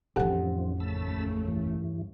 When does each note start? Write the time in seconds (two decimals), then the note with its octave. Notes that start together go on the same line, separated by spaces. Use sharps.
0.16 A1 F2 D#3 F3 C4 G4 A4 F#5
0.80 D#2 C#3 A3 A5 B5 E6
1.48 G2 E3